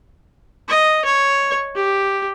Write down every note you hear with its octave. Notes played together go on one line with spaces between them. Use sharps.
D#5
C#5
G4